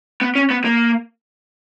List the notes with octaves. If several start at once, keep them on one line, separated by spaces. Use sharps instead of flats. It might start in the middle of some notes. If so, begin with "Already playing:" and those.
B3
C#4
B3
A#3